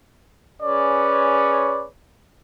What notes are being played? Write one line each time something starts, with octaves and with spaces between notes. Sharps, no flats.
C#4 G#4 B4 C#5 D5